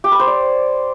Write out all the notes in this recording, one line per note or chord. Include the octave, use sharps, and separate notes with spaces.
G4
B4
C5
D5